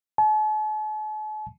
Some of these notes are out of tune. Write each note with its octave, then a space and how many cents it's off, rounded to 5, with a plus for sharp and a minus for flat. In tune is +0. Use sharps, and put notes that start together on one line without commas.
A5 -45